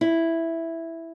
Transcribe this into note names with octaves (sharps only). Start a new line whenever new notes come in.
E4